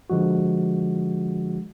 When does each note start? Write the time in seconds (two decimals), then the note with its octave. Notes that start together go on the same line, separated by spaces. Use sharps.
0.10 D3 F3 G#3 F#4